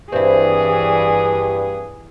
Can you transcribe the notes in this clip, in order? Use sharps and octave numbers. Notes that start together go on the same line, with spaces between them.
G2 E3 C4 E4 G#4